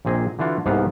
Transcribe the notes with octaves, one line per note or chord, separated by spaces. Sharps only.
A#1 A#2 C4 G#4 D#5
D3 E3 D4 F4 F#4
C2 G#2 A#3 B3 F5